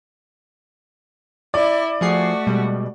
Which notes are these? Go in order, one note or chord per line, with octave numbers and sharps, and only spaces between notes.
E4 D5
F3 A3 F#4 G#4 C7
B2 G3 G#3